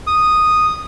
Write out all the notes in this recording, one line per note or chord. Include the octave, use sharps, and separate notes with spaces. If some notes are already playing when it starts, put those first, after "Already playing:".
D#6